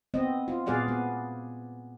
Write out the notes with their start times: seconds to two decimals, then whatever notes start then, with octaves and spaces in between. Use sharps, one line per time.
0.14 B3 C4 D#5
0.48 F4
0.66 A#2 B3 G#4 D5 F5 F#5
0.88 B3